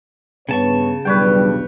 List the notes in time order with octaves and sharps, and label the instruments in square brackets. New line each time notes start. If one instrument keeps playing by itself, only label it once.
[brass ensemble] G2 B3 C#5 [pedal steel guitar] C#3 A5 C#6
[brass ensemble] B1 E2 G2 [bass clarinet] G3 [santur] B4 C#5 G5